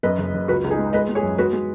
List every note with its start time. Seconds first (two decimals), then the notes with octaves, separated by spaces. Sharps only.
0.03 F#2 B4 D#5
0.18 F#1
0.34 F#1
0.48 C#2 F#4 B4
0.64 C#2
0.71 D#4 G#4
0.79 G#3
0.93 G#3 B4 D#5
1.09 G#3
1.15 G#4 C#5
1.23 F#2
1.38 G#3 F#4 B4
1.53 G#3